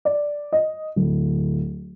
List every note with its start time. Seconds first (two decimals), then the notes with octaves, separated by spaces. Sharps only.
0.05 D5
0.52 D#5
0.96 D1